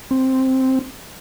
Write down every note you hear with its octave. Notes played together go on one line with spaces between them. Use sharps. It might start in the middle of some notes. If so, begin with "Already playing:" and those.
C4